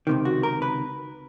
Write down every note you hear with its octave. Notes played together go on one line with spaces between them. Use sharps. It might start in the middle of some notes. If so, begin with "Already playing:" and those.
C#2 C3 D#3
F#4
A#4
B4